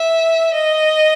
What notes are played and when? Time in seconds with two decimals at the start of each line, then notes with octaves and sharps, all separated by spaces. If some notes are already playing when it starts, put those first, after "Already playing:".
Already playing: E5
0.54 D#5